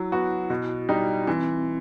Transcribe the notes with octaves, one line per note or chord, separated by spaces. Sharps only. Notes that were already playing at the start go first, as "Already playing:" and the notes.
Already playing: F#3 E4
B3 F#4
B2 F#4
G3 D#4
E3 C4